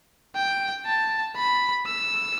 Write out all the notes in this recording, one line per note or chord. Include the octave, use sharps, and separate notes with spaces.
G5
A5
B5
E6